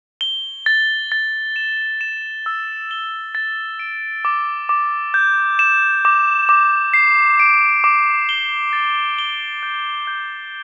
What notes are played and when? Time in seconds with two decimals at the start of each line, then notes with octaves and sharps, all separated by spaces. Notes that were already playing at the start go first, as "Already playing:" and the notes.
0.21 G7
0.66 A6
1.12 A6
1.56 E7
2.01 E7
2.46 E6
2.91 G7
3.35 A6
3.80 D7
4.25 D6
4.69 D6
5.14 G6
5.59 E7
6.05 D6
6.49 D6
6.94 C7
7.39 D7
7.84 D6
8.29 G7
8.73 A6
9.19 G7
9.63 G6
10.07 G6